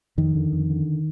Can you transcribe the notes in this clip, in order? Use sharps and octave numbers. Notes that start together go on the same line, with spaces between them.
F2 D#3
D3
F2
D3